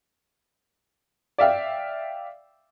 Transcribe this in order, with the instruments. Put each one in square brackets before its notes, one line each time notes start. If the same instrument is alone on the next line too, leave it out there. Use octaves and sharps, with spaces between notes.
[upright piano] D5 E5 F5 G5